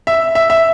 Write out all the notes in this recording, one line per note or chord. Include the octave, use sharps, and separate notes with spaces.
E5
E5
E5